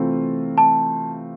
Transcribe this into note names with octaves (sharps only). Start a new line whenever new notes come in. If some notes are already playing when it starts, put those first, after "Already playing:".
Already playing: C3 E3 A3 C4 F4
A5